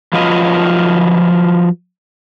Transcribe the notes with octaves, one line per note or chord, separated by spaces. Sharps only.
F3 F#3 F4 B4 D#5